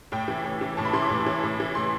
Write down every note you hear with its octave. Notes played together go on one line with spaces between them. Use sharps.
A2 G5
E3
A2
E3
A2 A5
B5
E3 C6
D6
A2
E3
A2
E3
A2 C6